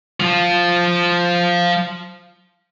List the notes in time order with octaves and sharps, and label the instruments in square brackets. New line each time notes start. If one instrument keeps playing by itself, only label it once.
[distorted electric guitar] F3 F4